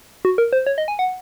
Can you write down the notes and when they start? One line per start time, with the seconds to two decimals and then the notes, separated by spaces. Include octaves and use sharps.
0.25 F#4
0.38 A#4
0.53 C5
0.67 C#5
0.78 D#5
0.88 G#5
0.99 F#5